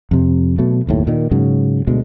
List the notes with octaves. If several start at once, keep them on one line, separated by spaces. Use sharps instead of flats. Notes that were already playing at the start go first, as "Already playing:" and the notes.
F2 C3
B2 F#3 A3
F#1 D#2 A2
A#2 D#3
G#2 C#3 F#3
D2 B2 G#3